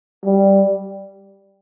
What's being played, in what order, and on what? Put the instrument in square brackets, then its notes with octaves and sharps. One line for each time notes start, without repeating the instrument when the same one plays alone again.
[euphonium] G3